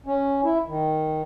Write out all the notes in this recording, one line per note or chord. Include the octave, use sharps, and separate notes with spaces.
C#4
E4
D#3